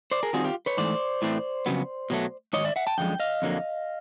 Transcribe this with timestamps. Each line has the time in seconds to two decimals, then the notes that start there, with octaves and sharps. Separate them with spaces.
0.11 C5 D5
0.23 G#4 A#4
0.33 D#3 G3 C4 F4 F#4 G#4
0.44 F4 G4
0.66 B4 C#5
0.77 G#2 E3 A3 C5 D5
1.22 A2 E3 A3 C4
1.66 F2 C#3 F#3 B3
2.10 B2 F#3 A3
2.53 G#2 D#3 F#3 C#5 D#5
2.65 D5 E5
2.76 E5 F#5
2.87 G5 A5
2.98 F#2 D3 F3 G#3 G5
3.20 D#5 F5
3.42 F2 D3 F#3 A#3